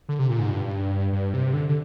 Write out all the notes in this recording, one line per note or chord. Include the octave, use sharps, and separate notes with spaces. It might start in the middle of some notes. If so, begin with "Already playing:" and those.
D3
C3
A#2
G#2
G2
G2
C3
D3
D3